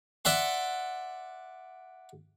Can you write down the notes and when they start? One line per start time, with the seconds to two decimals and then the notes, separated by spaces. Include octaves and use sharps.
0.25 D5 E5 F#5 C6